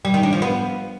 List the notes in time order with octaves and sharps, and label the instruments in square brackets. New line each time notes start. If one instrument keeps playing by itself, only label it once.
[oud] G3
D#3
D4
F3
B3